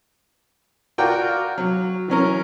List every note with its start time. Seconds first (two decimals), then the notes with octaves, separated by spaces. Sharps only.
0.98 F4 F#4 A#4 D5 G5
1.58 F#3
2.08 E3 F#3 C#4 A#4